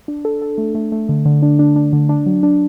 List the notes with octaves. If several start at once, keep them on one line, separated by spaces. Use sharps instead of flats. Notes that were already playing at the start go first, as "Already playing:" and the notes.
D4
A4
A4
A3
A3
A3
D3
D3
D4
D4
D4
D3
D4
F#3
D4